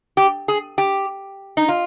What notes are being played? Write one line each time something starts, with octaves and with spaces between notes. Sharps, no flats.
G4
G#4
G4
D#4
F4